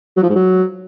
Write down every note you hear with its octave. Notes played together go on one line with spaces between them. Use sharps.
F#3
F3
G#2
F#3